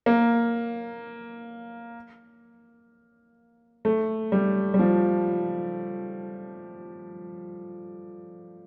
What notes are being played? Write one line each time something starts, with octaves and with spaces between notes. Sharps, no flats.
A#3
A3
G3
G3
F3